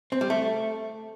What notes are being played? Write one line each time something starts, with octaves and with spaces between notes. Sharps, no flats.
C4
G3
A3